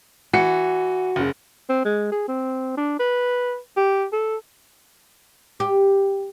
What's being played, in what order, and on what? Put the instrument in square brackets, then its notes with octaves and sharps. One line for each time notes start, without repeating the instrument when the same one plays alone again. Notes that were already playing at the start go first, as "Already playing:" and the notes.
[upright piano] E3 C#7 [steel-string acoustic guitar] F#4
[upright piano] F#1 C#3
[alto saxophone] C4
G#3
G#4
C4
D4
B4
G4
A4
[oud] G4